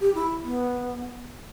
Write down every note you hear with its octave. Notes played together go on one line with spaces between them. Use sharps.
G4
E4
B3